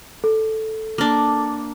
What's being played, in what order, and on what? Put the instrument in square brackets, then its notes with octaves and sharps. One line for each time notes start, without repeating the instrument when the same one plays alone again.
[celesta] A4
[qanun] A#3 D4